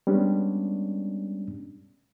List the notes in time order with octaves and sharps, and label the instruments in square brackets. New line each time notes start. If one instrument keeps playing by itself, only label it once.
[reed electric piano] G3 G#3 B3 C#4 D4